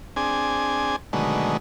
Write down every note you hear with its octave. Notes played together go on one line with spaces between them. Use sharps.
C4 D4 G#4 G#5
B2 D3 D#3 F#3 G#3 A3